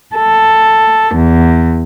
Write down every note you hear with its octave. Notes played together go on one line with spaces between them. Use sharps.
A4
E2